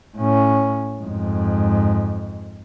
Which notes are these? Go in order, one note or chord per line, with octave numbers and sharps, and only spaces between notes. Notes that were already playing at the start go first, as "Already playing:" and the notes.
A2 C#4
F2 G#2